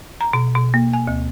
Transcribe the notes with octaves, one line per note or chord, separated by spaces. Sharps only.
A#5
B2
B2
A#3
G#5
D2